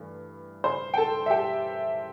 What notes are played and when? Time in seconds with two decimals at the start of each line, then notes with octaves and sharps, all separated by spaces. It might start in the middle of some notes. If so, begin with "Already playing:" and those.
Already playing: G2 E3 A3
0.64 C5 C6
0.94 G5
0.97 A4 A5
1.26 E5
1.30 G4 G5